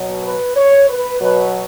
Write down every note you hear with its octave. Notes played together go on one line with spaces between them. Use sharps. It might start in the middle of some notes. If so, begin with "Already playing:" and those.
Already playing: B2 F#3
B4
C#5
B4
B2 F#3 B4